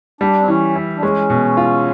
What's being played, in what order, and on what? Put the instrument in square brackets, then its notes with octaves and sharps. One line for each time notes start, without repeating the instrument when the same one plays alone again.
[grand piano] G3 [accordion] D4
[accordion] C4
[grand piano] E3 [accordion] C#4
[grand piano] E4
[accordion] D4
[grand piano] G#3 [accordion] C#4
[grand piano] B2
F4